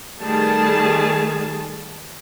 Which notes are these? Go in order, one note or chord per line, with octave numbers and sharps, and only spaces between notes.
D#3 G3 A3 G#4 A5